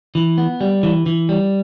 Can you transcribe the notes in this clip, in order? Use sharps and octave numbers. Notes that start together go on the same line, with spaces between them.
E3
B3
G3
E3
E3
G3